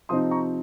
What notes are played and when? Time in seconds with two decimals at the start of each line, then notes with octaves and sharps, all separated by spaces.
0.09 C3 F3 C4 D#4 C6 D#6
0.31 A#5 C#6